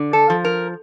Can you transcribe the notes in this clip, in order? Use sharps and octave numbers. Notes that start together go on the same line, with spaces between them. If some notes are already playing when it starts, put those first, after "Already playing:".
Already playing: D3
A4
F3
A#4